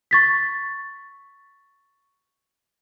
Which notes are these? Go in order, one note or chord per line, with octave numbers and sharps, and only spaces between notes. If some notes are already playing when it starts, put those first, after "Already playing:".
C#6 A6 B6